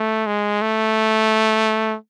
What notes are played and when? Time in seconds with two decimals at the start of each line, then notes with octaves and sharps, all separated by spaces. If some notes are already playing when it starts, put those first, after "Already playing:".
Already playing: A3
0.26 G#3
0.62 A3